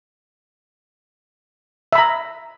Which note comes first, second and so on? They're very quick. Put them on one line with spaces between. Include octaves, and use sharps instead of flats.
E5 B5 A#5